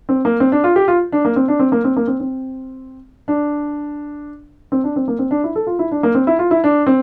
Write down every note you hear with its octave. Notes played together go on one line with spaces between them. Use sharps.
C4
A#3
C4
D4
F4
G4
F4
D4
A#3
C4
D4
C4
A#3
C4
A#3
C4
C4
D4
C4
D4
C4
A#3
C4
D4
E4
A4
F4
E4
D4
A#3
C4
E4
F4
E4
D4
C4